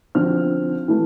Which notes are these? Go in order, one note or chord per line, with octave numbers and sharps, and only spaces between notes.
D3 F3 C4 F6
E3 A3